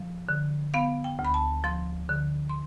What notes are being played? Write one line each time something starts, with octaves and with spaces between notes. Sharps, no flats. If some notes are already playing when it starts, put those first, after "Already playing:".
Already playing: F3
D3
B3 F5
G5
D2
B5
A5
F3 C6
D3
C6